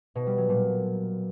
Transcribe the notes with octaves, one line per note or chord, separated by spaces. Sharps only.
B2
G3
F#3
A#2